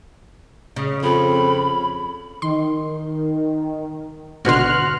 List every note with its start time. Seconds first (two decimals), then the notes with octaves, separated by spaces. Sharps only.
0.76 C#3
1.03 F2 B5
2.42 D#3 C6
4.45 G#1 B2 D3 F#4 C6 F6 F#6